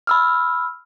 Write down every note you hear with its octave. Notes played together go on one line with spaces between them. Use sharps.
B5 E6 F6